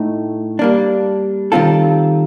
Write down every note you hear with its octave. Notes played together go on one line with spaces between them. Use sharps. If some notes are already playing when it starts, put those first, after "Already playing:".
Already playing: A2 A3 D#4
G3 A#3 D4
D#3 G3 C4 F4 A4